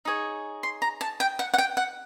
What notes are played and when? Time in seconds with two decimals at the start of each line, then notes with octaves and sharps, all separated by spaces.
0.05 D#4 G#4 C#5
0.63 C6
0.82 A#5
1.01 A5
1.20 G5
1.39 F#5
1.54 F#5
1.58 G5
1.77 F#5